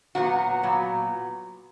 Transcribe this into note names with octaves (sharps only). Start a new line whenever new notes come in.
A#2 F#3 B3 F#4
A#2 F#3 B3